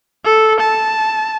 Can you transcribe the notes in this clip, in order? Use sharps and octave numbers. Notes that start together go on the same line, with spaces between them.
A4
A5